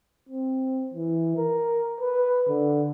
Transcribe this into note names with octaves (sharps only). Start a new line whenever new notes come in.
C4
E3
A#4
B4
D3